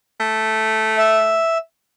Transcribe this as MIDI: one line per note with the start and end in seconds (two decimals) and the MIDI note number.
0.20 1.45 57
0.97 1.58 76